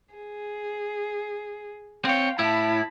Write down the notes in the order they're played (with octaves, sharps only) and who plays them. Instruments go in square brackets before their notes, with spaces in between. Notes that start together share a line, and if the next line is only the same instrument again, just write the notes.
[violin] G#4
[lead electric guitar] C4 C#5 [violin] F5 G5
[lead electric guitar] A2 E4 [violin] A5 B5